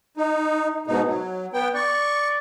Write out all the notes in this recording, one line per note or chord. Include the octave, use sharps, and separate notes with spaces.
D#4
G#2 B2 D#4
F#3
B3 G5
D5 C#6